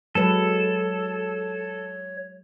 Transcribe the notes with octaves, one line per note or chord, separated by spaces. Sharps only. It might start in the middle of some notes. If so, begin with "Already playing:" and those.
F#3 G#3 A4 B4 C#5